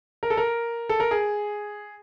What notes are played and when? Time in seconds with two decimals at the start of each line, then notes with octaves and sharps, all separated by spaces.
0.23 A#4
0.30 A4
0.37 A#4
0.89 A4
1.00 A#4
1.11 G#4